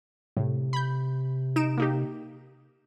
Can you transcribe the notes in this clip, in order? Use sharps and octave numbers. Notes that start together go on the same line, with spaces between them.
A2 C3
B5 G6
D#4 D7 E7
A#3 D#4 G4